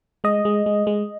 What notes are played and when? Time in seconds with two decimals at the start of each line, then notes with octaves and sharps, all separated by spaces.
0.24 G#3 D#5
0.45 G#3
0.66 G#3
0.87 G#3